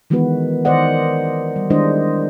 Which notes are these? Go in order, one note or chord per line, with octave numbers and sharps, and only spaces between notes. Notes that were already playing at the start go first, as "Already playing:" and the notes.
D#3 E3 G#3 B3 F#4 B4
D#3 C5 D5 D#5 F#5
G3
D#3 G#3 D4 E4 C5 D#5